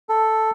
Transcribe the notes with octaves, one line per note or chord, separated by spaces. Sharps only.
A4